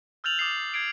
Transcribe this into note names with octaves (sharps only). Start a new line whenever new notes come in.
E6 F6 G6 A6 F7 F#7
D6 D#6 A6 C7
G#6 C7 D7